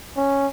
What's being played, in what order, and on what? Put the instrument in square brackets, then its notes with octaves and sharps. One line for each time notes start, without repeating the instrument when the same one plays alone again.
[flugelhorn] C#4